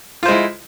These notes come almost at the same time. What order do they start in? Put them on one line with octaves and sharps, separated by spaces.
F4 C5 G#3 E4